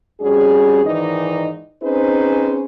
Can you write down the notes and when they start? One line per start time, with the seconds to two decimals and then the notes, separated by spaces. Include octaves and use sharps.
0.21 F2 G3 C#4 F#4 G#4
0.84 G#2 D#3 E3 D#4 D5 D#5
1.83 C4 C#4 D#4 G#4 B4 C5